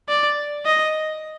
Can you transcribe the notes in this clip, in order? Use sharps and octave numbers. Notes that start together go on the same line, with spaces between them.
D5
D#5